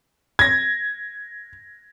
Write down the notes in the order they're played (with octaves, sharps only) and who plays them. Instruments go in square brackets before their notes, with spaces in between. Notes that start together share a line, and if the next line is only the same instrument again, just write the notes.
[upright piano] G#6 A#6